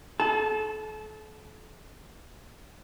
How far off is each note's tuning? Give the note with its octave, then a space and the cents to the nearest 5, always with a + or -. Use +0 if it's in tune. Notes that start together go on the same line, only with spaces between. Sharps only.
A4 -35 A5 -15